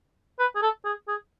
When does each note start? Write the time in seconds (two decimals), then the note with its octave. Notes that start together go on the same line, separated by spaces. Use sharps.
0.39 B4
0.56 G#4
0.62 A4
0.85 G#4
1.08 G#4